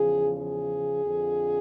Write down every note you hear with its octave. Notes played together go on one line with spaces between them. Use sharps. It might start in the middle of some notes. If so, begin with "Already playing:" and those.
Already playing: E2 C#3 F3 G#4
G#4
F2 D3 F3